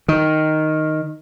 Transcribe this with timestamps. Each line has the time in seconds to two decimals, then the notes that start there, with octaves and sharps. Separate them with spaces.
0.08 D#3